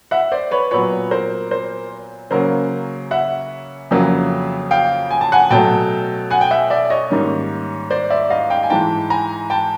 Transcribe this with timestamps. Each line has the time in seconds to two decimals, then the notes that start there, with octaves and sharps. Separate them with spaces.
0.11 E5 F#5
0.32 C5 D5
0.51 B4 C#5
0.71 A#2 F#3 B3 B4 C#5
1.11 A#4 C5
1.51 A#4 C5
2.31 C#3 F#3 A#3 C#4 A#4 C5
3.11 E5 F#5
3.91 F2 C#3 F#3 A#3
4.71 F5 G5
5.11 G#5
5.21 A5
5.32 F#5 G#5
5.50 B2 F#3 A3 G5 A5
6.31 F#5 G#5
6.41 G5
6.51 E5 F#5
6.70 D5 E5
6.90 C#5 D#5
7.10 G#2 D#3 G3 A#3 C#4
7.90 C5 D5
8.10 D5 E5
8.30 D#5 F5
8.50 F5 G5
8.63 G#5
8.70 G#2 E3 G#3 G5 A5
9.10 G#5 A#5
9.50 G5 A5